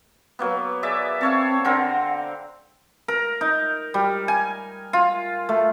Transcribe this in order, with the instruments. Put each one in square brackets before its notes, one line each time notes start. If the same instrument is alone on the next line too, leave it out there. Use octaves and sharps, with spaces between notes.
[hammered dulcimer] F#3 A#3 B3
G#4 D5 E5
[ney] C4 [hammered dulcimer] A4 C#5 F5
[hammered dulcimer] D3 C4 A#4 [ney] F#5
[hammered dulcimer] A#4
D#4
G3
G#5
F4
A3